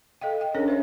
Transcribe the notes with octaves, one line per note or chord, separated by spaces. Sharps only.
A4 D#5 F5 G5
G5
C#4 D4 G#4 A#4 C#5
C5 E5